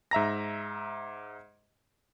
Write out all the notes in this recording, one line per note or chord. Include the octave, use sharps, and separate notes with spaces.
G#2 E5 A#5 A#6